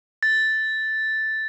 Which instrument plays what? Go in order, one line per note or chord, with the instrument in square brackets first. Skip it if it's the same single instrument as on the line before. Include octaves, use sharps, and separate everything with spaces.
[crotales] A6